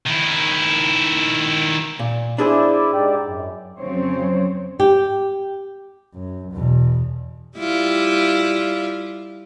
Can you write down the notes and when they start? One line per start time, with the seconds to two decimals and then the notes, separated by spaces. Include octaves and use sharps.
0.07 D#3 E4
1.99 A#2
2.38 D4 E4 G#4 C5 D5 E5
2.93 G#2 G4 D5
3.25 F#2
3.79 F2 C#3 F#3 C4 C5 C#5
4.80 G4
6.14 F#2
6.53 E2 B2
7.58 G3 E4 F4